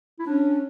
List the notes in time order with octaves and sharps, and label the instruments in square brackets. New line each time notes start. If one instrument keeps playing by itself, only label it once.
[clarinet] E4
[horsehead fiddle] C#4 [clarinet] D4